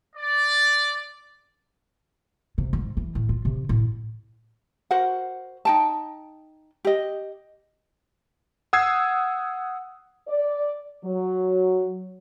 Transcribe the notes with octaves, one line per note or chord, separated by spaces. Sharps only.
D5
C3
G#2
E3
A2
F4
C3
A2
F#4 A#4 C5 F#5
D#4 G5 A5
G4 D#5
F#5 D#6 E6 G#6 C7
D5
F#3